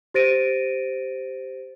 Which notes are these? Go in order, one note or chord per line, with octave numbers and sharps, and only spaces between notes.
G4 C5 A6 A#6 D7 D#7